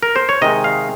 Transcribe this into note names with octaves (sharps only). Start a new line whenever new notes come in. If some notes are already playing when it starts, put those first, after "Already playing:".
A#4
C5
C#5
C3 D#3 G#3 D#5
F5